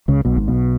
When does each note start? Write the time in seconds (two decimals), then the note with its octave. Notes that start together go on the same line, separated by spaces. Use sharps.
0.08 C#2 C#3
0.25 B1 B2
0.36 G#1 G#2
0.48 B1 B2